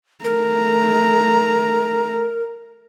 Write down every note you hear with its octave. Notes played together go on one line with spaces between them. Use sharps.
A3 A#4 A#5